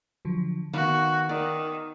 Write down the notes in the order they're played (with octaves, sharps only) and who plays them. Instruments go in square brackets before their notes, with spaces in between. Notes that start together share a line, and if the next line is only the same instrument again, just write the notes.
[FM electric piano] D3 F3 F#3
[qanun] D#3 B3 [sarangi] F#4 [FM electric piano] F5
[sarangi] D#3 [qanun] D5